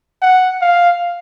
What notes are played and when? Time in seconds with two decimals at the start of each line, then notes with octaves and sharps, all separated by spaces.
0.22 F#5
0.62 F5